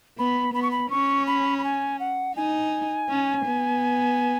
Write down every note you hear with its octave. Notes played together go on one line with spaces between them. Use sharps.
B3 B5
B3 B5
C#6
B5
C#4 C#6
B5
B5
G#5
F#5
D#4 G#5
C#4
B3